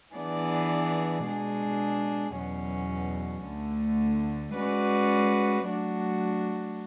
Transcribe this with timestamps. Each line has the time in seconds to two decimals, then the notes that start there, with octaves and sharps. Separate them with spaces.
0.14 E3 B3 D4 G#4 D5
1.24 B2 G#3 D4 G#4
2.35 E2 B2 F#3 C#4
3.44 D2 D3 A3
4.55 G#3 C#4 F#4 B4 D5
5.65 F#3 A3 D4 F#4